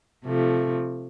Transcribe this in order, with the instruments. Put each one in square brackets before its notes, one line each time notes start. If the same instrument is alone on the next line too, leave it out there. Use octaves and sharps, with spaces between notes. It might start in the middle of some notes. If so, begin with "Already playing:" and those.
[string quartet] C3 F3 A3